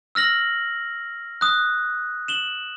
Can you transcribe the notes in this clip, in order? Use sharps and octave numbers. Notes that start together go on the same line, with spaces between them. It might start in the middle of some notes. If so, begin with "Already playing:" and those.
E6 F6 A#6 F#7
D#6 F#6
E7 F#7 G7